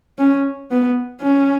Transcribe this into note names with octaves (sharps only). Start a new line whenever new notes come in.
C#4
B3
C#4